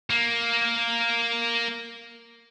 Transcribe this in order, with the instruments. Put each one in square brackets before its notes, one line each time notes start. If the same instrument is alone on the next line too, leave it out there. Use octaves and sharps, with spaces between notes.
[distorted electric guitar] A#3